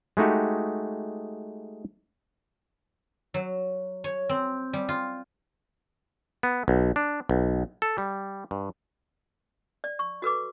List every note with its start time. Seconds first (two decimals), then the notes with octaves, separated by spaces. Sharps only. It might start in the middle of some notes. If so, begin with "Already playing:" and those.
0.17 G#3 A3 D#4 F#4 G4
3.34 F#3
4.04 C#5
4.29 C4
4.73 G3
4.89 F4
6.43 B3
6.68 B1
6.96 D4
7.29 B1
7.82 A4
7.98 G3
8.51 G2
9.84 D5
9.99 C#6
10.22 F#4 A4 B4 D6